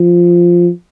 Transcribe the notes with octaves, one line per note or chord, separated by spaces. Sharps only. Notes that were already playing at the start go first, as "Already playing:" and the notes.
Already playing: F3